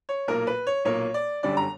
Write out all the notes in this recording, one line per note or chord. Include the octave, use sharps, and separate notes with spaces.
C#5
B1 A#2 A#3 A#4
B4
C#5
B1 A#2 A#3 C#5
D5
G1 F#2 D3 G3 D5
A#5